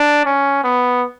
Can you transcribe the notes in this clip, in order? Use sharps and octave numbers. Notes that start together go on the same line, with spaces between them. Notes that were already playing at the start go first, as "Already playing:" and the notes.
Already playing: D4
C#4
B3